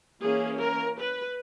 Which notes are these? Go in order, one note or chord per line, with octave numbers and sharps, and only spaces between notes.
E3 A#3 C#4 G#4
A#4
B4